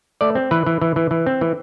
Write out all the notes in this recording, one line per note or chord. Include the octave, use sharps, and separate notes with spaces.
A3 D5
C4
E3 B4
E3
E3
E3
E3
C4
E3